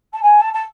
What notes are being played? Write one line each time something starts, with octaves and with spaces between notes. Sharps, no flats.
A5
G#5
A5
A5